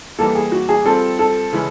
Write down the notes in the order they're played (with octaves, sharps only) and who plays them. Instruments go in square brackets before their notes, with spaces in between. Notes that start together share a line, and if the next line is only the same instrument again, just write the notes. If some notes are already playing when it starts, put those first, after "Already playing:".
[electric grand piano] E3 G3 A#3 [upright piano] A4
[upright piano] G#4
F#4
G#4
[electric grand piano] G3 C4 F4 [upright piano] A4
[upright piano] A4
[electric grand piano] C#3 E3 G#3 C#4 E4